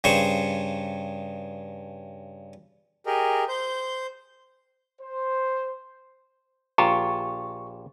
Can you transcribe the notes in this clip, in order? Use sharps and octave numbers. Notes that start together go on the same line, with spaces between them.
G2 C#3 C5 C#6
G4 G#4 A#4 D#5
C5 G6
C5
A#1 F4 G4 A#5 C#6